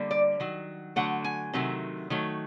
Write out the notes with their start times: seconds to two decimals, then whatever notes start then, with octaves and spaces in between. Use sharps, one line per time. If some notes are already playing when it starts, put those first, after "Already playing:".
Already playing: D3 G3 A#3
0.11 D5
0.40 D#3 F#3
0.96 D3 F#3 A3 F#5
1.24 G#5
1.53 C3 D#3 F#3 A3
2.10 D#3 F#3 A3